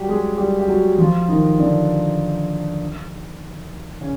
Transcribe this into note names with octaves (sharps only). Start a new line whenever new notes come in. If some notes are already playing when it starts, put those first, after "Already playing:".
Already playing: F#3 G3 F#4 G4
G#3 G#4
G3 G4
G4
F#3 F#4
F3 F4
D#3 D#4
D3 D4
C#3 C#4